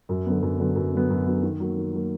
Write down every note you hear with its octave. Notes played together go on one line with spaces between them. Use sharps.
F#2
D3 F#3 B3
F#2
D3 F#3 B3
F#2
D3 F#3 B3
F#2
D3 F#3 B3
D#3
F#3 A#3
D#3
F#3 A#3